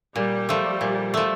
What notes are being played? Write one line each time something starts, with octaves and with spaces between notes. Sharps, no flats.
A#2 G3
F3 A3
A#2
F3 A3